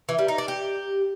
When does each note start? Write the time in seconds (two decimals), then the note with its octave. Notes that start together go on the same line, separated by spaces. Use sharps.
0.09 E3
0.19 G3
0.28 D#4
0.38 D4
0.48 G4